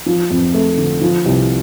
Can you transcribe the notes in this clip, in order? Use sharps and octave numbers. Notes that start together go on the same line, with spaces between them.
F3
F2
A3
D3
F3
C2